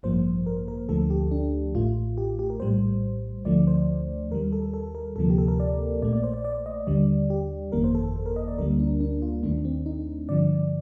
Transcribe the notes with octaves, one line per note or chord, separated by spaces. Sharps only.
A1 G2 F3 A#3 C5
A#4
A#4
D2 D3 F3 A3 A4
G4
D4
A1 A2 A3 F4
G4
G4
A#4
A#1 A2 G3 C5
D2 D3 F3 A3 D5
C5
D#2 D#3 G3 A#4
A4
A4
A#4
D2 C3 F3 A#3 A4
G4
A4
A#4
D5
A#1 A#2 A3 D5
D5
C5
D5
D5
D#5
D#2 D3 G3 D5
G4
G1 F2 D#3 A#3 A#4
C5
A4
A4
A#4
D#5
D5
D2 D3 G3 A#3 A#4
D4
D4
F4
D#2 D#3 A3 D4
C4
D#4
G2 D3 F3 D5